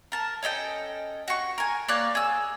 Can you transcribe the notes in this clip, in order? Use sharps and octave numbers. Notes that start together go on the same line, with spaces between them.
A#4 A5
C#4 A4 D#5 G5
F#4 C#6
A#4 G#5
A#3 C#5 D5 F#6
G#4 E6